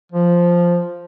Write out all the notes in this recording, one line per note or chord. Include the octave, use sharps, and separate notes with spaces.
F3